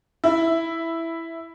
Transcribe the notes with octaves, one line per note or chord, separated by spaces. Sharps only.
E4